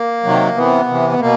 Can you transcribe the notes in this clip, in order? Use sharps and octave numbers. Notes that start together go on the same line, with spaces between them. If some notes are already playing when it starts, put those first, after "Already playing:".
Already playing: A#3
C3 D#3 F#3
C3 E3 B3
C3 E3
B3
B2 A#3